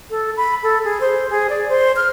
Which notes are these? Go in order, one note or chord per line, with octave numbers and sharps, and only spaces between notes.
A4
B5
A4
G#4
C5
G#4
D5
C5
F6